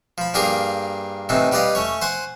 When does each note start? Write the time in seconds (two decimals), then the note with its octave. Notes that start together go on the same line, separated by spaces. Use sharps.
0.18 F3 B5
0.34 G2 A#3 G4 G#4 A#4 F5
1.29 A2 C3 E3 C4 D#4
1.52 G3 G4 B4 D5 D#5 F5
1.75 A3 C#4 C#5
2.02 C5 F#5 G#5